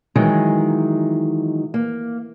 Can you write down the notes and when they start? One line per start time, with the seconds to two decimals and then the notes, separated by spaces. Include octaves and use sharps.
0.15 D#3 E3 F#3 G#3
1.74 A#3